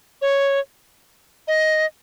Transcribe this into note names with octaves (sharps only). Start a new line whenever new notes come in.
C#5
D#5